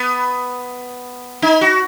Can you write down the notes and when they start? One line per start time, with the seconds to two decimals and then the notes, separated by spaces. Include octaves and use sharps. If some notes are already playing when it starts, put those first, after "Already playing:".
Already playing: B3
1.42 D#4
1.61 F#4